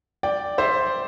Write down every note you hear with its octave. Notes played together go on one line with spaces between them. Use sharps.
D5 G5
C5 E5